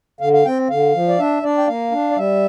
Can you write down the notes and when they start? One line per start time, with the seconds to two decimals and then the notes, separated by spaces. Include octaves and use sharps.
0.20 D3 F5
0.33 F5
0.45 C4 G5
0.70 D3 F5
0.94 F3
1.08 D5
1.19 D4 E5
1.43 D4 D5
1.58 G5
1.67 A#3 F5
1.92 D4
2.11 D5
2.16 G3 E5